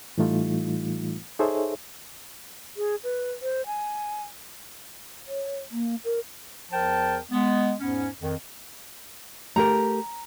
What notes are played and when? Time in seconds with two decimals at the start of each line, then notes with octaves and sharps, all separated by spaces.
0.18 A2 E3 G3 A3 D#4 F4
1.39 D#4 G#4 A4 C5 C#5 E5
2.77 G#4
3.04 B4
3.42 C5
3.66 G#5
5.27 C#5
5.71 A#3
6.04 A#4
6.72 E2 F3 A#4 G5 A5
7.31 G#3 B3
7.80 E2 G#2 B3 C#4
8.22 F2 D#3
9.56 A3 G4 A#4 A#5